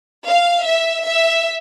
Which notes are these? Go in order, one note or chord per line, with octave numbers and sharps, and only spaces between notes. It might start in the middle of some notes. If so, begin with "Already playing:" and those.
F5
E5
E5